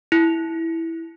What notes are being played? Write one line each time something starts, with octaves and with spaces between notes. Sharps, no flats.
E4